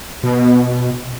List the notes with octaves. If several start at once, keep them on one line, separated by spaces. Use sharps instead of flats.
B2